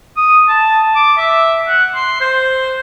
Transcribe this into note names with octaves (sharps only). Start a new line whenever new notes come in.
D#6
A5
D6
E5
F#5
C6
C5